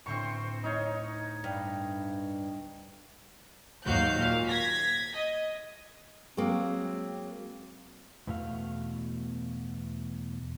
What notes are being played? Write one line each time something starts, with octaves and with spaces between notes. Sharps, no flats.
D2 A2 B3 C4 C5 C#6
A3 D#4 C#5 F6
G2 F6
D#2 G#2 F#3 F#4 F5 G6
A#2 F5
G#6 A#6 B6
D#5
F#3 G#3 A#3 C4
E2 B2 A3 F#4 F5